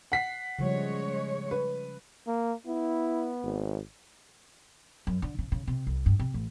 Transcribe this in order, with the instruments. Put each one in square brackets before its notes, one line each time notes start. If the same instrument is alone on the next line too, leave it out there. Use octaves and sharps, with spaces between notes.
[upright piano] F#5 B6 C7
[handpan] C#3 F3 G3 [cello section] G#3 C#5
[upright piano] B4
[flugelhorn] A#3
[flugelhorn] B3 [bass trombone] E4
[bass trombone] G#1
[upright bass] F#2
D3
C#3
C#3
C3
C2
G2
C3
A1